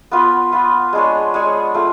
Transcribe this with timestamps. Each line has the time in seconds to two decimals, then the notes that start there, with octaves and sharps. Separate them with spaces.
0.11 B3 F4 B4
0.52 B3 F4 B4
0.93 G#3 D4 G#4 C#5
1.34 G#3 D4 G#4 C#5
1.74 A3 F4 G#4